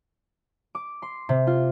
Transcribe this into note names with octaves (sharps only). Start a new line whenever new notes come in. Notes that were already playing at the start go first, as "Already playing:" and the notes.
D6
C6
C3
F4